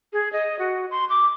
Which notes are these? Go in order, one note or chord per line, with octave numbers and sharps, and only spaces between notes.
G#4
D#5
F#4
C6
D6